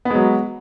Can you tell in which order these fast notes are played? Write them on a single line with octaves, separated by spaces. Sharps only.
B3 G#3 F#3